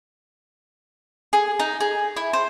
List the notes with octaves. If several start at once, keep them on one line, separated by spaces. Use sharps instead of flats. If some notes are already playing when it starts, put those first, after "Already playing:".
G#4
D#4
G#4
E4
C5